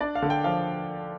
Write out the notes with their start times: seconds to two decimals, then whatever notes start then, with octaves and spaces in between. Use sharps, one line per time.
0.01 D4 D5
0.15 F5
0.22 D3
0.30 G5
0.44 F3 F5